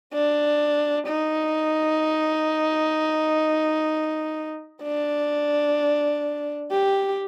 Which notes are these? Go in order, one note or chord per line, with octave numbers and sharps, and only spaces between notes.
D4
D#4
D4
G4